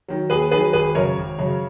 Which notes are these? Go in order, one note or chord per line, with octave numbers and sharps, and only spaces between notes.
D#3 F#3
D#2 G#4 B4
D#3 F#3 G#4 B4
G#1 G#4 B4
F#2 C#3 A#4 C#5
G#1
F#2 C#3